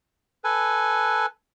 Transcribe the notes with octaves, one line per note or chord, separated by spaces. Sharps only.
A4 B4 G#5